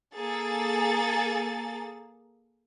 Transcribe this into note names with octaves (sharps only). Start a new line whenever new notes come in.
A#3 G#4 A4 A6